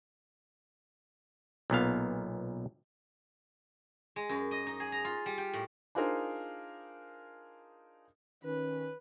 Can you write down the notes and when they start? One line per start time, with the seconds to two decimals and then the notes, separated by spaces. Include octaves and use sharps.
1.70 B1 A#2 B3 F5
4.16 G#3
4.29 F#2
4.51 D#5
4.67 D#4
4.80 G#4
4.92 A#5
5.04 F4
5.26 G3
5.38 G4
5.53 A2
5.95 D4 D#4 F4 G#4 A#4 C5
8.44 D#3 C#4 B4